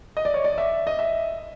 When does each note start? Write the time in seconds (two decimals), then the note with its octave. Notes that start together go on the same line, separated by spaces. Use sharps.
0.17 D#5
0.25 D5
0.34 C#5
0.44 D5
0.58 E5
0.87 D#5
0.99 E5